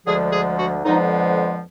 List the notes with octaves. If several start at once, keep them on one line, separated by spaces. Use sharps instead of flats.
D2 D3 F3 G#3 G#4
G#4
F#4
F2 D3 F3 G#3 B3 D#4